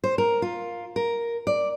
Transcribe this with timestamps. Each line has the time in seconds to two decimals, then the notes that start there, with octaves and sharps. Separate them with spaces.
0.04 C5
0.18 A#4
0.42 F4
0.96 A#4
1.47 D5